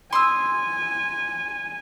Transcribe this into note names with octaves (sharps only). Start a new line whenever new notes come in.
G#5 C6 D#6 E6